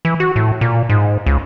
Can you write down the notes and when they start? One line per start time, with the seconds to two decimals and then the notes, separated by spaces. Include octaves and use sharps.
0.05 E3
0.20 F#4
0.36 A2
0.61 A#2
0.89 G#2
1.26 C#2